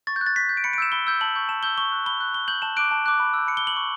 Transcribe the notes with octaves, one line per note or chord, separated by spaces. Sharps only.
C#6 A6
G6
F#6
A6
C#6 B6
G6
D7
B5 C#7
D7
E6 G6 E7
B5 G7
E6 G6
A5 F#7
C#6 G6
A5 E7
E6 G6 G7
C#6 G7
F#6
B5 G7
F#6
C#6 G7
G6 F#7
A5 E7
D6 F#6 D7
A5
D6 F#6
B5
E6 G6
B5 C#7
G7
F#6 F#7
C#6